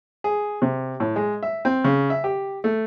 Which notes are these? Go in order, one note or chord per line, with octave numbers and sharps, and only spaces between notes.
G#4
C3
A2
G#3
E5
C4
C#3
E5
G4
A3